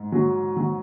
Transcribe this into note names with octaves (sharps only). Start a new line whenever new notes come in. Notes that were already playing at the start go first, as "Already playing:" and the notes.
Already playing: G#2
F#3
F#3